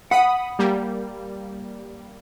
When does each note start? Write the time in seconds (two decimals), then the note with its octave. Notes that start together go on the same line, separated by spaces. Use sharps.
0.11 F#5 B5 D#6
0.59 G3 A#3